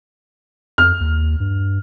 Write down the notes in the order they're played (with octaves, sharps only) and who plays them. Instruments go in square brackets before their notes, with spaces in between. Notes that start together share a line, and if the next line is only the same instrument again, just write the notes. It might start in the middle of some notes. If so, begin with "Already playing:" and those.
[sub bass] F2 [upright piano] F6
[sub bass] D#2
G2